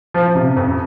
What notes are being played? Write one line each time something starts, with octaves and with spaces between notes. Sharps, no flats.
F3
C3
F2